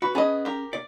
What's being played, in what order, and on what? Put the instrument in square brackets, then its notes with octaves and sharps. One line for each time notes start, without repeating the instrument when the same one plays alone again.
[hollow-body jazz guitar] F#4 [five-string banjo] B4
[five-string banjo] B3 D#5 [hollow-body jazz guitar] C#4 G#4 A5
[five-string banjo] G4 A#4
[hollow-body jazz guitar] D5